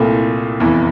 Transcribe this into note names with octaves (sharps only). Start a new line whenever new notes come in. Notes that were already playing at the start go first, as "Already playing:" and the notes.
Already playing: C2 A#2 A3 E4 A4
F1 E2 E3